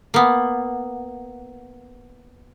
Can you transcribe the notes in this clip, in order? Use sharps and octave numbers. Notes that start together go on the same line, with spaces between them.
A#3 B3